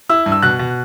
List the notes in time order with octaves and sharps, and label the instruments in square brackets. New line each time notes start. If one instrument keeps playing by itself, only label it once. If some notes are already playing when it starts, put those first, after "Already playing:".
[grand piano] E4 E6
G2
E6
B2 F#6
B2